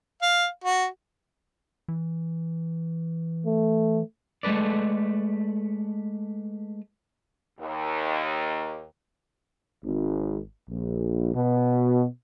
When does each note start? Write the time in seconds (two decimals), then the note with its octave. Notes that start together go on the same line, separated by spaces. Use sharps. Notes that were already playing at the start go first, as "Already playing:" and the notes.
0.22 F5
0.64 F#4
1.88 E3
3.46 A3
4.43 G#3 A3 A4 B4 D5
7.60 D#2
9.85 G#1
10.69 A#1
11.35 B2